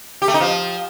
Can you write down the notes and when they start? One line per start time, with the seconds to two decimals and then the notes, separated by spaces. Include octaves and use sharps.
0.22 G4
0.28 A3
0.34 D#4
0.40 F3